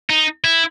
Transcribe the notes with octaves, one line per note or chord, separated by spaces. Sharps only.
D#4
E4